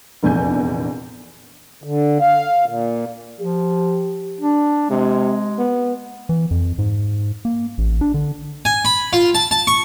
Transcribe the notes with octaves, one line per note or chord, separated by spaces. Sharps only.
F1 A#1 E2 G#5 G6
D3
F5
A#2
F3 G4
D4
C3 G#3
B3
E3
F2
G#2
A#3
A1
D4
D3
G#5
B5
F4
A5
A5
C#6